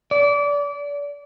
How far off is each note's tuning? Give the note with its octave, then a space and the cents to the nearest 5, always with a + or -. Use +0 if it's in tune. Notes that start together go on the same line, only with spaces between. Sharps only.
D5 -30